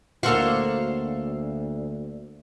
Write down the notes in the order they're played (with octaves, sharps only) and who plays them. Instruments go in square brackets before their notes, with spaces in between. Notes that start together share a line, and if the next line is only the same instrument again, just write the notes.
[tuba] D2 [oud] A#3 F#4 [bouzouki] A4 C5 F5